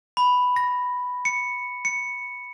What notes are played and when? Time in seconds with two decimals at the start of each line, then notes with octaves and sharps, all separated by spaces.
0.17 B5
0.56 A#6
1.25 C#7
1.85 C#7